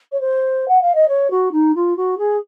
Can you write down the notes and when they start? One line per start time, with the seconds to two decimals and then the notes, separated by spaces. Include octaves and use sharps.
0.11 C#5
0.20 C5
0.68 F#5
0.81 F5
0.94 D#5
1.08 C#5
1.30 F#4
1.51 D#4
1.75 F4
1.96 F#4
2.18 G#4